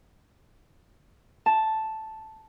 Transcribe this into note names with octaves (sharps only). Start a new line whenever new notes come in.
A5